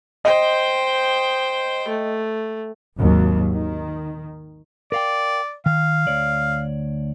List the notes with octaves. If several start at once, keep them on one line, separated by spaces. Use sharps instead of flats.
C5 D#5 G5
A3
G#1 D#2 F#3
D#3
A#4 D5 F5 G5
D#3 F5
D2 C#5 D5